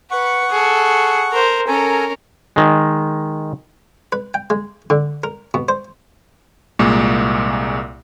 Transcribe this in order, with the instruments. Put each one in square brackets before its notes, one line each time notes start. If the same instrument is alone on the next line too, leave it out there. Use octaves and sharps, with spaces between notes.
[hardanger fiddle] B4 [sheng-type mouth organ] F#5 C#6
[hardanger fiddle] G#4 A4
A#4 C5
[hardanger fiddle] C#4 A#4 [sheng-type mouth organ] A4 G#5 A#5
[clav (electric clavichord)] D#3 G#3
[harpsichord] B4
G5
G#3
D3
A#4
B2
C5
[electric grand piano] C2 A#2 G#3 A#3